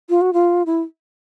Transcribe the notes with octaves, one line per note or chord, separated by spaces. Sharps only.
F4
F#4
F4
E4